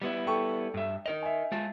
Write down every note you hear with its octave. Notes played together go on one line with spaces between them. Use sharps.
G3 B3 E4
A4 G5 C#6
G2 E5
D#4 A#4 D#5 F7
E5 G#5
G#3 F4 A5